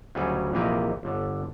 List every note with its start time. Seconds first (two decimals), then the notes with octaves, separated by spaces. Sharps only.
0.15 D2 C#3 F#3 G3 G#5
0.52 A#1 C3 E3 A#3 G4 D#5
1.03 G1 D3